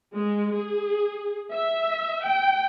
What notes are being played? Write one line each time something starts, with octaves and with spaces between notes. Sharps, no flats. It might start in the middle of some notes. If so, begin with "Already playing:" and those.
G#3
G#4
E5
G5